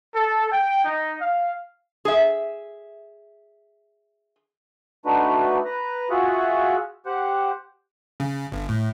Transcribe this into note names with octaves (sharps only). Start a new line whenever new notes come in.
A4
G5
D#4
F5
G#4 E5
A3 D4 D#4 F#4 B4
B4 A#5
F4 F#4 G#4 E5 F#5
G4 C5 F#5
C#3
G1
A2